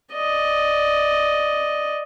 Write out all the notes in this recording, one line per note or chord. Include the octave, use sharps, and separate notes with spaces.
D5 D#5